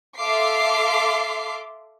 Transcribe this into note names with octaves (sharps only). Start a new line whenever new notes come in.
A4 E5 F5 C6 D6 C7